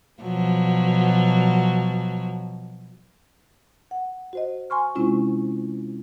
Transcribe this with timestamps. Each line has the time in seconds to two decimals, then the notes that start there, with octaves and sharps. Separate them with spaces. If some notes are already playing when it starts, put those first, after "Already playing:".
0.22 B2 F3 F#3
3.91 F#5
4.33 F#4 C5 D#5
4.70 G#5 C6 C#6 F6
4.95 C3 G#3 C4 C#4 E4 F4